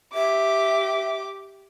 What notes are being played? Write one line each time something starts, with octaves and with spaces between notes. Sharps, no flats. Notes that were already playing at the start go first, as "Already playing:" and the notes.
G4 E5 D6